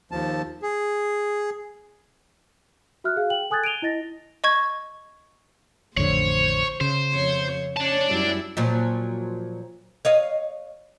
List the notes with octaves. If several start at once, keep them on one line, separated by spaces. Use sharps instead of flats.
D#2 F3 A5
G#4
F#4 E5 F6 F#6
G#4 F5
G5 F#7
A4 G#5 D#6 F#6 G#6 A6
D7 D#7 F7 G7
E4 D#5 A6 A#6
D#5 C#6 G#6
A1 F2 D3 C5 C#5
C#3 C5
F2 C#5
C#4 C#5 D5 A5
F#2 G3 E4
A#2 F3 F#3
C#5 D#5 F5